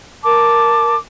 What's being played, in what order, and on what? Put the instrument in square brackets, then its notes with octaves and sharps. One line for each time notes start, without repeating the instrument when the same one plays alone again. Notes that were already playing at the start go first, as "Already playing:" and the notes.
[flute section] A#4 A5 D6